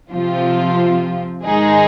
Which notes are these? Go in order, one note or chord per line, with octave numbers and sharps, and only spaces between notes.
C3 F3 C4 F4
G#2 D#3 G#3 D#4 G#4